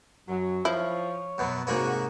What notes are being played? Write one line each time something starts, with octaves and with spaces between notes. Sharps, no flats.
F#2 F#3
F3 E4 C#5
F#2 B2 B3
G#2 C3 G#3 A#3 C#4 F#4